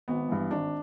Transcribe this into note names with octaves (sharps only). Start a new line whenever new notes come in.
G#1 B3
G2 E3
G#1 D4